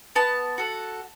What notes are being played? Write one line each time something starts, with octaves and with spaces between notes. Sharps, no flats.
B3 A5
F#4 A4